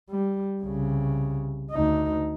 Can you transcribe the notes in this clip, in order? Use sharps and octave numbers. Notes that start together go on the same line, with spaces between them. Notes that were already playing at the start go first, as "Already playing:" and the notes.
G3
C2 C#3
D2 D#4